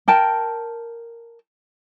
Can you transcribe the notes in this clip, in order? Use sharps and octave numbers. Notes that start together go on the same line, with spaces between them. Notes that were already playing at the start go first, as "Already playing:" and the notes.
A#4 G5 A5